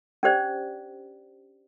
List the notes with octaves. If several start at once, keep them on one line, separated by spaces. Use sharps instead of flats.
C#4 D4 G4 C5 D5